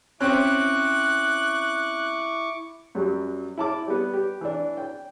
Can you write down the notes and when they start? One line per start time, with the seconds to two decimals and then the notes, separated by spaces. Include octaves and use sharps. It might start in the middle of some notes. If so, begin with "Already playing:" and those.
0.20 C4 C#4 E4 C#6 D6 F#6
2.95 F#2 F#3 G3
3.57 E4 A5 D6
3.88 G3 B3
4.14 G4
4.41 E3 D4
4.77 G5